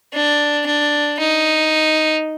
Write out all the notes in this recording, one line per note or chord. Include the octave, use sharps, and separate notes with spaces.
D4
D4
D#4